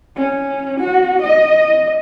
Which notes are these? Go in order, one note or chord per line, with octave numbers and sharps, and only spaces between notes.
C#4
F#4
D#5